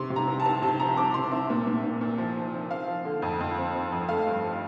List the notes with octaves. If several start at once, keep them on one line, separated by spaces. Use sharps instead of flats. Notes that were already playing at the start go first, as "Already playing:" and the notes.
Already playing: C3 C6
C3
A#5
C2
A5
C2
C3 A5
F3 A#5
C2 D6
C3 C6
C2 E5
A#2
A#2
A#2
A#2
F3
F3
C4
C4 F5
F3
D3
F2
F2
C4
F3
F2
A3 F5
G2
F3